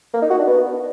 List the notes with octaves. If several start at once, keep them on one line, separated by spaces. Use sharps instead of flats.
A#3
D#4
F#4
D4
B3